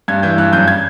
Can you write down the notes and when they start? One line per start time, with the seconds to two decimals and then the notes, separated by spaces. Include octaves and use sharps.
0.08 G2 G#6
0.23 E3 G6
0.38 G2 F#6
0.53 F#2 G6
0.68 G#6